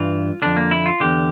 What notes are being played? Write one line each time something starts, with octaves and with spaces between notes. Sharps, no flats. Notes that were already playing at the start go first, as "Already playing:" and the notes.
Already playing: G2 E3 F4
F2 D3 D4
A#3
E4
F4
E2 D3 G4